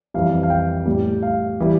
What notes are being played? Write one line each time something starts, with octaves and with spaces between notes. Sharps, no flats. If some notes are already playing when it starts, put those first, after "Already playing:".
F2 E3 G3 F5
F5
G5
A2 G3
F5
E3 G3